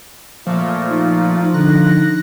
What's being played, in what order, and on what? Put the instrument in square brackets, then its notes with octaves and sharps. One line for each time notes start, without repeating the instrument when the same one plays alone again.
[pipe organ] A#2 A3 A#3 [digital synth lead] F3
[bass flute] D#4
[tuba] D3 [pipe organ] F#6 A#6